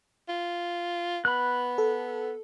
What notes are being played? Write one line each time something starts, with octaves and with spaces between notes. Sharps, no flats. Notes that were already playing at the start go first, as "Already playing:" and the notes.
F4
B3 B5 F#6
A4